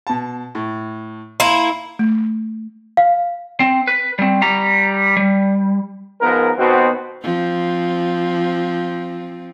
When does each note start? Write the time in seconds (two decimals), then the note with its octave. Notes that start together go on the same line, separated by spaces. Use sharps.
0.07 B2 A5
0.55 A2
1.40 A#3 E4 C6 E7
1.99 A3
2.97 F5
3.60 C4
3.87 B4
4.19 G3 C4
4.42 G3 A#5
5.17 G3
6.21 G#2 F3 B3 A#4
6.58 D#2 B2 B3 C4 F#4 C5
7.23 F3 C4